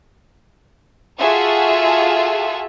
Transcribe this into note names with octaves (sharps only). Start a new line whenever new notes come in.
F4 F#4 G#4 A4 E5